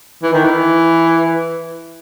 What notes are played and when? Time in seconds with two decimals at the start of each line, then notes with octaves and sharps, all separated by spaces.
0.23 E3
0.33 D#3
0.44 E3